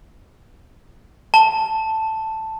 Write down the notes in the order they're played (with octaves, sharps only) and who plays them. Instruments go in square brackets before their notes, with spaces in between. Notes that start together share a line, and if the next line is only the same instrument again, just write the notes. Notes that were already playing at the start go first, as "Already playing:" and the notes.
[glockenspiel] A5